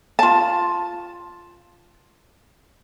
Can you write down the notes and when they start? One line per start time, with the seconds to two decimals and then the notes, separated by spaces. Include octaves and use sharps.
0.19 F4 A5